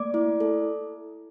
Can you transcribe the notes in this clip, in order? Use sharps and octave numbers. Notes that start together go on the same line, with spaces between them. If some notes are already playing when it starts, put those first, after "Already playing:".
Already playing: A3 A#3 D5 D6
E4
A4